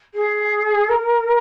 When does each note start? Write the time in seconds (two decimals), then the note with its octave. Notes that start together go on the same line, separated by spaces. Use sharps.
0.14 G#4
0.89 A#4